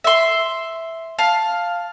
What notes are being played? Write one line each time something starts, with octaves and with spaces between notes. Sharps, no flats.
E5 C6
F5 A5